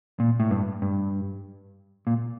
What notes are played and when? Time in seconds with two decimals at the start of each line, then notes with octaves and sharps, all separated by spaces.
0.20 A#2
0.40 A2
0.51 G2
0.82 G2
2.07 A#2